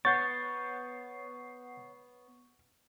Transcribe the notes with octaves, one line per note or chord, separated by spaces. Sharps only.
B3 C#5 F#5 C#6 G6 A6 C7